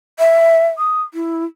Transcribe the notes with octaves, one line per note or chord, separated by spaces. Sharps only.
E5
D#6
E4